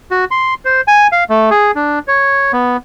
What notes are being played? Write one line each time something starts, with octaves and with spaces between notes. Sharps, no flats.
F#4
C6
C5
G#5
F5
A3
G#4
D4
C#5
B3